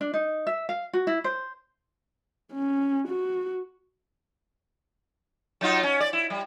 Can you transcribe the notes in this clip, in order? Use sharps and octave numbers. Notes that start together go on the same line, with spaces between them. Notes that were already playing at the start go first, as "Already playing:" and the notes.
D4
D#4
E5
F5
F#4
E4
C5
C#4
F#4
F#3 D#4 F4
C#4
D5
E4
G3